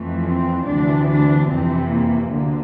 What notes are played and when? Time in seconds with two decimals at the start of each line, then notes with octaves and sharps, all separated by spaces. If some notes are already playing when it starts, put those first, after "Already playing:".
Already playing: F2 E3 A3
0.27 C4
0.68 D2 C3 E3 D4
1.10 D4
1.50 F2 C3 E3 C4
1.91 A#3
2.32 D2 D3 A#3